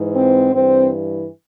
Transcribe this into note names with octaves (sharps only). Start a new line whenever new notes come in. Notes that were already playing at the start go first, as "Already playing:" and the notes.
Already playing: G#2 E3
C4
G2 E3 C4